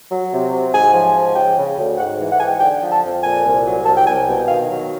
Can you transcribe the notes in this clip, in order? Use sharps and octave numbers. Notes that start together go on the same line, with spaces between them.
F#3
C3
F#3
G#2 G#5
F3
G#2
C#3 G5
C#3
D2
G#2 F#5
E3
F#5
G#2 G#5
G5
D3 G5
F3
A5
F2
A#2 G#5
C2
F#3
C2 A5
G5
C2 G#5
B2 G5
D#3 F5
F#3